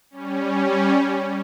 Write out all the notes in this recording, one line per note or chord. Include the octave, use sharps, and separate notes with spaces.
G3 C#4